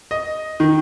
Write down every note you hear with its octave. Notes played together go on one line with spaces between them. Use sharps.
D#5
D#3